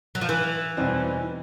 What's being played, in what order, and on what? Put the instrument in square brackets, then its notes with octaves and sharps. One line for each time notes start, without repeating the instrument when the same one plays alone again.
[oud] F#3
F3
E3
[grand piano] E2 B2 G3 C4 D#4